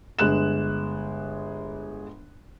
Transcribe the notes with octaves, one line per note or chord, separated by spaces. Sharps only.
G1 G#3 F#6 E7